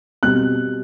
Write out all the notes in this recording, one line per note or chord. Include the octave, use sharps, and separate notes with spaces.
B2 G3 C4 F#6